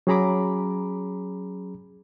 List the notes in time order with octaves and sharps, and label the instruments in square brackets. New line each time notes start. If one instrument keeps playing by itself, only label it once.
[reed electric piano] F#3 C#4 G#4 A#5 B5 D6